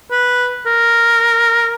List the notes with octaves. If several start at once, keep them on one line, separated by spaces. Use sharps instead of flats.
B4
A#4